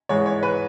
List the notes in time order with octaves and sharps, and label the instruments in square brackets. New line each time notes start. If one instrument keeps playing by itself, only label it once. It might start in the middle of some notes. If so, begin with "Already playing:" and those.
[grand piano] G#2 E3 G#3 C#5
C#5
B4